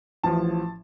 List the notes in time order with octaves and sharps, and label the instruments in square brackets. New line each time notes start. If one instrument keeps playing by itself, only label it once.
[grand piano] A1 A2 F3 A5